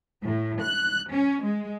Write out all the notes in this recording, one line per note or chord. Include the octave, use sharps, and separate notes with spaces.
A2
F#6
C#4
G#3